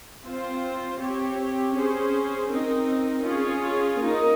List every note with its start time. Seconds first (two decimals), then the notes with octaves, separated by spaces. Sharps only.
0.23 C4 F4 C5
0.99 C4 G4 C#5
1.74 C#4 G#4 C5
2.50 C4 D#4 A#4
3.25 C#4 F4 G#4 C#5
4.01 A#3 D#4 A#4